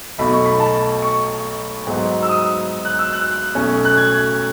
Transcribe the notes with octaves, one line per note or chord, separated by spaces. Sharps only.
B1 B2 A3 D#4 B5
C#6
B5
A5
C#6
G#2 F#3 B3 D#4
E6
D#6
F#6
E6
F#6
B1 B2 A3 C#4
F#6
G#6